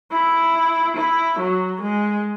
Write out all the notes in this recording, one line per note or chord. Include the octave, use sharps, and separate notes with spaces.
E4
E4
F#3
G#3